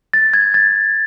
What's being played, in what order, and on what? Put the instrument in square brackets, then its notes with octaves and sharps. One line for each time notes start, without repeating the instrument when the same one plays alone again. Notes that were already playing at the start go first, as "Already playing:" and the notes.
[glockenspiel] A6
G#6
A6